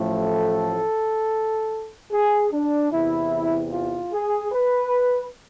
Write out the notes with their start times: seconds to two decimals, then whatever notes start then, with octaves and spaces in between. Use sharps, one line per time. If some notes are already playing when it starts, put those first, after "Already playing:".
Already playing: A1 A2 F3 A3
0.11 A4
2.11 G#4
2.52 D4
2.92 E2 C3 E3 E4
3.72 F4
4.12 G#4
4.52 B4